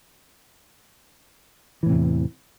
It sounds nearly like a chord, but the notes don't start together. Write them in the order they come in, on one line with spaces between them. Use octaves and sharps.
E3 A2 C3 E2